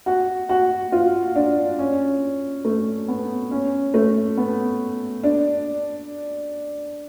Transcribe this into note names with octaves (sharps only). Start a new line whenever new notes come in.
F#4
F#4
F4
D4
C#4
A3
B3
C#4
A3
B3
D4